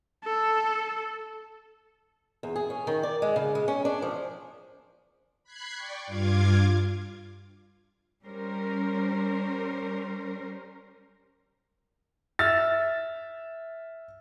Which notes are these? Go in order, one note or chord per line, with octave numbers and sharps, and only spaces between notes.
A4
E2
G#4
C#4
D#3
D5
G#3
C#3
G#3
C#4
D4
F3
B5 F#6 G#6 C7
D5 G5 C#6
G2 F4 F5 D6 G#6
G3 C#4 A#4 C5
E5 E6 F6 A6